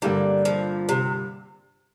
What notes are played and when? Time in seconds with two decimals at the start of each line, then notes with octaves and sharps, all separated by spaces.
0.02 G2 D3 G3 A#3 D4 A#4
0.45 F3
0.89 C3